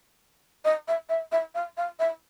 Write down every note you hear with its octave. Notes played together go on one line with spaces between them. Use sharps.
D#5
E5
E5
E5
F5
F5
E5